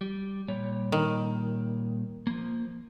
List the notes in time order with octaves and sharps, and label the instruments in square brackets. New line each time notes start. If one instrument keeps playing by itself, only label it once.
[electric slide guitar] G3
A#2 G3 C#5
[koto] D#3
[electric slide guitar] F3 A#3